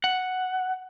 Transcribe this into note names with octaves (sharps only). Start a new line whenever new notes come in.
F#5